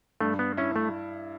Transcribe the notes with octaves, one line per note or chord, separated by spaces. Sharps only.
G2 A3
B3
C#4 E4
A3